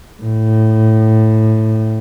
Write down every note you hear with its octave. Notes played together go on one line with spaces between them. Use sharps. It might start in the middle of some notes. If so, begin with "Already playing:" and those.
A2